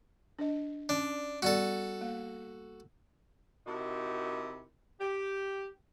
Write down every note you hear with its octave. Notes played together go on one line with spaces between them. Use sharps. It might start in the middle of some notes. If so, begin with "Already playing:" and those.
D4 D#5
C#4 D4 D5
G3 B3 F#4 A4 D5
A#3
C3 D#4 E4 F#4 A#4
G4